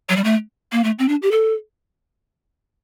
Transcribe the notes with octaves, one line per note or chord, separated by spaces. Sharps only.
F#3
G3
A3
A#3
A3
C4
D4
G4
A4